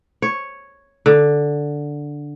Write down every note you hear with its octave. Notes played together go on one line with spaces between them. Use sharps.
C#5
D3